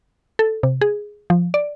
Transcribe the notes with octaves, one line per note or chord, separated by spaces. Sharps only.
A4
C3
G#4
F3
D5